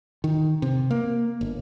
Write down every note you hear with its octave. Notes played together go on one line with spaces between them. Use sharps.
D#3
C3
A#3
G1